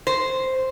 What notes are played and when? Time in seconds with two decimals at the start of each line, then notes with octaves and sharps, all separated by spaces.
0.07 C5